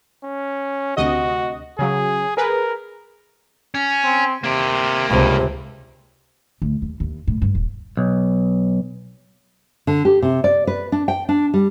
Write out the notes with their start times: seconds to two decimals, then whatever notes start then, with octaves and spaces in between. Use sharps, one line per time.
0.24 C#4
0.97 D2 C3 F#4 D#5
1.79 C#3 F#3 G#4
2.37 G#4 A#4 B4
3.75 C#4
4.04 C4
4.44 C3 A#3 G4
5.09 C#2 G2 C3
6.62 D2
6.82 D#2
7.00 D#2
7.27 A2
7.42 G2
7.55 D#1
7.97 B1
9.87 D3
10.05 G4
10.22 C3
10.44 D5
10.67 B4
10.92 D4
11.08 G5
11.29 D4
11.54 G3